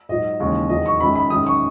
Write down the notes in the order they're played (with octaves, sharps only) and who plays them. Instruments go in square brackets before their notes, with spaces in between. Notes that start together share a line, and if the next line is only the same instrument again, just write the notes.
[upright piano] G#2 F#3 D#5
D#2 C#3 E3 G#3
E2 D#3 F#3 D#5
C#6
F#2 D#3 G#3 B5
B5
F#2 D#3 G#3 D#6
C#6